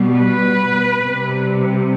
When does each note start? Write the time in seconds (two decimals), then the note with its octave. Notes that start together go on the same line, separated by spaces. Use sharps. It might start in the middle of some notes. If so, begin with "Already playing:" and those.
Already playing: B2 G3
0.16 B4
1.03 C3 G3